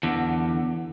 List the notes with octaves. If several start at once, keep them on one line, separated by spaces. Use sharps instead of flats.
E2 D3